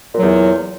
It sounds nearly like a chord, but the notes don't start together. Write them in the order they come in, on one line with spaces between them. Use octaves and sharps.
A#2 F#3 E2